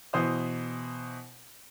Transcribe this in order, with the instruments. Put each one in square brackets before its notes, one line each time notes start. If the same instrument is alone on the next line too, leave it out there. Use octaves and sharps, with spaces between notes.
[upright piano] B2 E3 C5 D#6